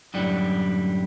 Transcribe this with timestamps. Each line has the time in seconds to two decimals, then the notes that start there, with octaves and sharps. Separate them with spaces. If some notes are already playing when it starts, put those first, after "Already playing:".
0.14 F#2 A2 D3 G3